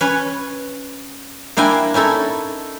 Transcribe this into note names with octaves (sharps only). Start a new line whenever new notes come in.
C#4 B4 C#5
A#3 D4 E4 G5 G#5
C#4 D#4 E4 A4